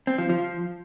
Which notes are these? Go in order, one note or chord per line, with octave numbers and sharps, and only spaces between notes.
C4
F3
F3